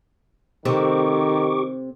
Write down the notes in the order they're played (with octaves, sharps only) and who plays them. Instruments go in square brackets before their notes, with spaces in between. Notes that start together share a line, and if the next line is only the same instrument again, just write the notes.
[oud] C3 A3 C4 [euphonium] D#3 [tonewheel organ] G4 C#6 D6